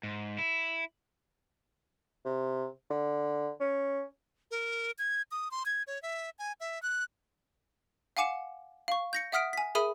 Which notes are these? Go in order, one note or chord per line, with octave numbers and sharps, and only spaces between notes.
G#2
E4
C3
D3
C#4
A#4
G#6
D#6
C6
G#6
C#5
E5
G#5
E5
F#6
F5 F#5 G#5 D6 C#7 E7
F5 C#6
G6 A#6 C#7
E5 F#5 D#6 F6 B6 D7
G#5 B6
G#4 A#4 E5 B5 D#6 D#7